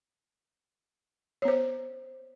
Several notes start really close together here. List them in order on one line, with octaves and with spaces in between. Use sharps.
C#5 B3 C5